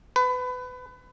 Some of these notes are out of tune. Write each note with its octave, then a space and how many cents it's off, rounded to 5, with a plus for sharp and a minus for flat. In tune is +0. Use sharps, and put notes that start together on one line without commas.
B4 +25